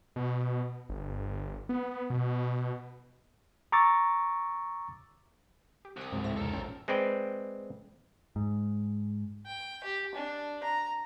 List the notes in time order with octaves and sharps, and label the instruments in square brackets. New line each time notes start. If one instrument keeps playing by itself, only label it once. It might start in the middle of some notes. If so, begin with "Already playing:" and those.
[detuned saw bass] B2
G1
B3
B2
[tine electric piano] A#5 C#6 D6 E6 A6
[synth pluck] G4
[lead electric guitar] C2 [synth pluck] F#5 D#6
[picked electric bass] C#2 G#2 [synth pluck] F#3 C4
[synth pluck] A2 E5 A#6
[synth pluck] E2 C3 D#3 [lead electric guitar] A4 A#4
[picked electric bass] A#1 [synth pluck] C#4 C5 G5
[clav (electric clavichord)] G#3 C4 B4 D5 G5
[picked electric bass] G#2
[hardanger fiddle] G5
G4
D4
A#5